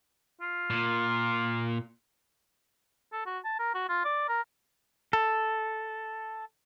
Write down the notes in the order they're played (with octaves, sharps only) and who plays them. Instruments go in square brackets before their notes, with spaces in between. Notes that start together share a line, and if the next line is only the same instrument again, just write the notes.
[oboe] F4
[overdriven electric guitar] A#2
[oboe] A4
F#4
A5
A#4
F#4
F4
D5
A#4
[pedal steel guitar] A4